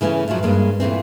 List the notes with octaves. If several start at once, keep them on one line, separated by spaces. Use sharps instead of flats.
C#3 E3 A3 C4 C#4
F#2 A2 F3 F#3
G2 G#3 A#3
A#2 E3 A3 C4